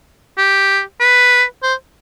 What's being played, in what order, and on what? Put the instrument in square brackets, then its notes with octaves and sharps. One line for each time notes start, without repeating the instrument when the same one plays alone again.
[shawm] G4
B4
C5